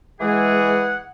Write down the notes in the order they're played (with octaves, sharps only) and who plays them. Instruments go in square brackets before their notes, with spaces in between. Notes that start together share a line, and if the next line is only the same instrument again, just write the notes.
[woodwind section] E3 G#4 [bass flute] G#3 [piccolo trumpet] F#5